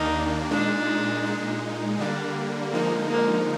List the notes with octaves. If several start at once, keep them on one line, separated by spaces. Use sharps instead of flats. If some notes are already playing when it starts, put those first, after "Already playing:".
Already playing: D#2 D#3 A#3 D4 D#4
A#2 G#3 D4 D#4
A#2 G#3 D#4
D3 G3 A#3 D4
D3 F3 G#3 A#3 D#4
A#3